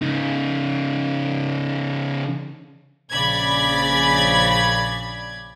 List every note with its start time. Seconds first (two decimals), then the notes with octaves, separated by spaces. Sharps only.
0.02 C#3 D#4
3.12 A#1 C#3 D5 B5 G#6